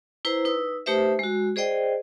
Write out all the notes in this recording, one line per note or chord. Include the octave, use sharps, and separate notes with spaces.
E4 B4 C5 A#5
D#4 B4 E6
A3 D#4 G4 B4 C5 E5
G#3 F#4
G#4 C5 D5 D#5 G5